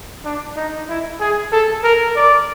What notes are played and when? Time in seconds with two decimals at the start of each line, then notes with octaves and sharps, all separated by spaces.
0.25 D4
0.57 D#4
0.89 E4
1.20 G#4
1.52 A4
1.84 A#4
2.16 D5